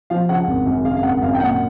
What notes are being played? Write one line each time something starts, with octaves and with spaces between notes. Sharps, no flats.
F3 F5
C#3 F#5
G#1
F#2
C#3 F5
F5
G#1 F#5
F#2 F5
G5
A#2 F#5